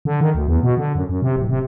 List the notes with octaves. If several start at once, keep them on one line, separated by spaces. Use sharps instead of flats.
D3
D#3
D2
E2
B2
D3
F#2
F#2
C3
D1
C3